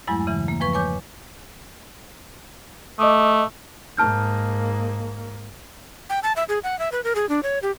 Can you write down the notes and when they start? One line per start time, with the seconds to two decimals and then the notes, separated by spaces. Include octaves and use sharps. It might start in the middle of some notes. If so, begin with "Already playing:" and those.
0.07 E2 G2 F#3 G#3 A3 E4
0.27 C#3 E3
0.48 A#3
0.60 E2 F3 B4 C#6
0.73 B4 C#5 G#5 D6 G6
2.99 A3 D#5 D6 D#6
3.97 G#2 A#3 A5 F6 G6
6.10 G5
6.23 A5
6.36 E5
6.49 G#4
6.64 F#5
6.79 E5
6.92 B4
7.04 A#4
7.15 G#4
7.29 D4
7.43 C#5
7.63 G4